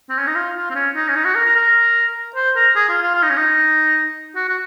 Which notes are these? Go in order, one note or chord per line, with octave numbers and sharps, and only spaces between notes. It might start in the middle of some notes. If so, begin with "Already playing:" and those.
C4
C#4
D#4
F4
F4
C4
C#4
D#4
C#4
D#4
F#4
A#4
A#4
A#4
C5
A#4
G#4
F4
F4
F4
D#4
C#4
D#4
F#4
F#4